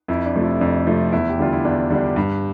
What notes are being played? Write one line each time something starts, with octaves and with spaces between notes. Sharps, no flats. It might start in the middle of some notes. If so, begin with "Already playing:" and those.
F2 E4
D4
C3 F3 A3
E4
F2 D4
C3 F3 A3
E2 E4
G4
D3 G3 D4 F4
E4
E2 D4
D3 G3 D4
G2